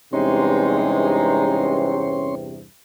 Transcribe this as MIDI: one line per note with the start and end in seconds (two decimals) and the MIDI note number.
0.13 2.62 40
0.13 2.62 43
0.13 2.62 48
0.13 2.03 56
0.13 2.35 61
0.13 2.03 63
0.13 2.35 73
0.13 2.35 84